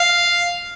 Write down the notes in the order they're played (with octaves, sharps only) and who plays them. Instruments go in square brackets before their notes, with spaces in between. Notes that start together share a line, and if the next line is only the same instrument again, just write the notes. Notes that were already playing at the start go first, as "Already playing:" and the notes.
Already playing: [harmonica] F5